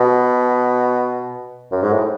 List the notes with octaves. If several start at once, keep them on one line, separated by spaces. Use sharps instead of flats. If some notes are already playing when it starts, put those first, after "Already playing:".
Already playing: B2
F#2
G#2
A2